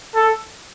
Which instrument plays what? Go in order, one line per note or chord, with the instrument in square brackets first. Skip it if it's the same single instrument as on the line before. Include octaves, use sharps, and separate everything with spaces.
[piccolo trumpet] A4